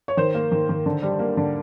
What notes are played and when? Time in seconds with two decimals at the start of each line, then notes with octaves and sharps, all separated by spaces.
0.08 C#5
0.17 D#3 C5
0.34 A#3
0.52 D#3
0.69 D#3
0.86 D3
1.02 G3
1.19 A#3
1.37 D3